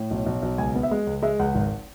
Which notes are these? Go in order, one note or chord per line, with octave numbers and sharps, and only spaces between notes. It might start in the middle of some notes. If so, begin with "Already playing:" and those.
Already playing: A2
B1
B1
B1
C#2 G#5
B3
E5
G#3
C#2
G#3 E5
C#2 F#5
G#1